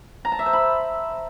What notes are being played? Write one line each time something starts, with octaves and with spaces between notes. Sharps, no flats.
A#5
A5
E5
C5
B5